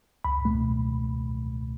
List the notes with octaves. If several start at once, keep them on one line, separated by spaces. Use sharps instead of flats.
C#2 B5
B2 A3